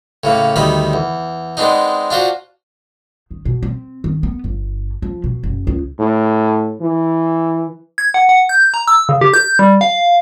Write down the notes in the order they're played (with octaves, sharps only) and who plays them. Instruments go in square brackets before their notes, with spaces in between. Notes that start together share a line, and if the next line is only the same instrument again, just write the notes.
[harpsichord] A2 C#3 A#3
D2 D#3 G3 D#4 B5
E2
G#3 B3 C4 D4 D#4
D4 F4 F#4 C5
[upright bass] D#3
B2
C4
D#3
B3
G1
F3
B2
F#1
C#2
[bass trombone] A2
E3
[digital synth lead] G#6
F#5
F#5
G6
A#5
E6
C#3
G4
G6
G3
F5